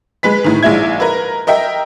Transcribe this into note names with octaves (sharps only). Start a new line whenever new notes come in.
G#3 B4 B6
A2 D#3
A#1 G#3 E4 E5 G#6
A#4 B4
A#4 D#5 E5 G5